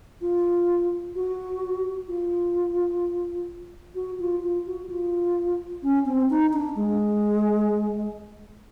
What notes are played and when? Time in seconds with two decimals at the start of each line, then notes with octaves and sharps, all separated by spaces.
0.21 F4
1.15 F#4
2.08 F4
3.95 F#4
4.20 F4
4.43 F4
4.66 F#4
4.89 F4
5.83 C#4
6.06 C4
6.30 D#4
6.53 D4
6.76 G#3